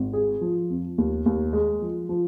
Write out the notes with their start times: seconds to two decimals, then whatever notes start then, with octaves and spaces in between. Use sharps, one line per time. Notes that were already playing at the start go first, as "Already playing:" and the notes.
Already playing: G#1
0.13 G#4
0.41 F3
0.70 F2
0.98 D#2
1.26 D#2
1.53 G#3
1.82 F3
2.09 F3